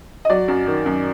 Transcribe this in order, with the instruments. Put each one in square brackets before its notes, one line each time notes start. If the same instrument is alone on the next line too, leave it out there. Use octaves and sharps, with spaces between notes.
[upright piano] D#5
F#3 D5
F#2
D#3
F#2